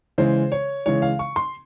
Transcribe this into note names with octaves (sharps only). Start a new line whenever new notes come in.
C#3 E3 G#3 C5
C#5
C#3 E3 G#3 C#5
F5
C#6
C6